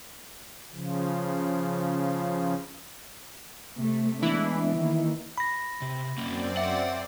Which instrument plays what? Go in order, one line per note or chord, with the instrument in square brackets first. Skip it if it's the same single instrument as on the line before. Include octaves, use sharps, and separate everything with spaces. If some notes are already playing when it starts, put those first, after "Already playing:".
[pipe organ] C#3 F3
[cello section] C3 A3
[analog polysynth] E3 E4 [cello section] G#3 B3 D4
[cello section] D#3 A#3
[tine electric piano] B5 A#6
[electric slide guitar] C3
[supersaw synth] F#2 C4 D5 [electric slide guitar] A#3 C#4
[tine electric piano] E5 [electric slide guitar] F#5